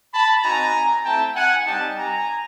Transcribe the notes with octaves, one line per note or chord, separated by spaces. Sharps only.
A5 B5
C4 D#4 F#4 G#5 A#5
A3 C4 E4 G5 A5
F#5 G#5
G3 C4 D#4 G4 G5 A5
G#5 A#5